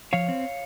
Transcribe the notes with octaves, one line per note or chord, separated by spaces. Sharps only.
F3 C#5 F5
C4